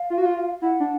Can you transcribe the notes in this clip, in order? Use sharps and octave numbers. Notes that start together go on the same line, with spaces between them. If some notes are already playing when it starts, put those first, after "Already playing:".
Already playing: F5
F4
F#4
F4
E4 F#5
D4